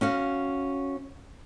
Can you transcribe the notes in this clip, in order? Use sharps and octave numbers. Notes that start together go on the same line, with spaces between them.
C#4 F#4 F5